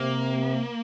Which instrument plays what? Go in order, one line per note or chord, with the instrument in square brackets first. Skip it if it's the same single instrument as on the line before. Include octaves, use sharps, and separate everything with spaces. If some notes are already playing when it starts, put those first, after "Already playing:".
Already playing: [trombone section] C3 [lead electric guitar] A#3